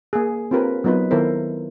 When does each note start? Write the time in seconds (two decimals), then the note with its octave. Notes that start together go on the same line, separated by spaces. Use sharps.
0.13 A#3 G#4
0.51 C4 D4 F4 G4 A#4 B4
0.84 F#3 B3 D#4 F4 B4
1.11 D#3 B3 E4 A4 A#4 C5